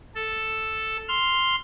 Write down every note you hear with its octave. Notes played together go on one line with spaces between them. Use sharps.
A4
C6 F6